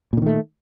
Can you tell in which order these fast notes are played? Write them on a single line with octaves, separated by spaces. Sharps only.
A#2 D3 D#3 A3